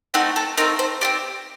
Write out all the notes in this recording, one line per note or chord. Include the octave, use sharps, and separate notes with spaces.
A3 C4 D#4 F#5
A4
A3 C4 D#4 A#4
C5
C4 D#4 G4 D5